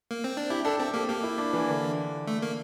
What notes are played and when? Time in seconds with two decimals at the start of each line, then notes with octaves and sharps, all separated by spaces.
0.11 A#3
0.24 C4
0.37 D4
0.50 E4 G4
0.65 D4 A4
0.79 C4 A4
0.94 A#3 G4
1.08 A#3 G4
1.23 E4
1.38 D4
1.53 E3
1.68 D3
2.27 A3
2.42 A#3